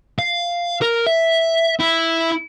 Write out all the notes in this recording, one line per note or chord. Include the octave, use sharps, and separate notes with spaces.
F5
A#4
E5
E4